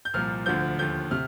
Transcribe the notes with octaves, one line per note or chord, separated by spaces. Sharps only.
G6
C2 A#2 F3 F6
D2 D3 F3 G6
D#2 D3 F3 G6
C3 F6